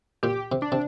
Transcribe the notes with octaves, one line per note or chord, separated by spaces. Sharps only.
A#2 G4
C3
D4
C3